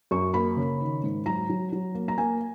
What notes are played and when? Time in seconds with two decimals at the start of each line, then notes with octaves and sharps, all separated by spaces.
0.11 F#2 C#6
0.34 A#3 B5
0.57 C#3
0.81 D#3
1.04 G#2
1.26 F#3 A#5
1.49 F#3
1.72 F#3
1.95 A#3
2.08 A#5
2.18 A#3 G#5